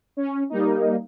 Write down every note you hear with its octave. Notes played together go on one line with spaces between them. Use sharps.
C#4
G3 A#3 D#4